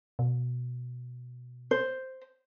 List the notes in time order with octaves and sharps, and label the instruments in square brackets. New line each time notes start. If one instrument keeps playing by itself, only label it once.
[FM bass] B2
[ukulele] C5